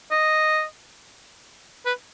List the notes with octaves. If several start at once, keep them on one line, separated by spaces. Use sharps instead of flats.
D#5
B4